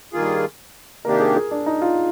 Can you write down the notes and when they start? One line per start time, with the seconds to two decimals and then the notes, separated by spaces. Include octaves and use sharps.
0.13 G2 D#3 A#3 F4 G#4
1.05 C3 D#3 A#3 D4 G4 A#4
1.20 G#4
1.36 G#4
1.51 D4
1.66 D#4
1.82 F4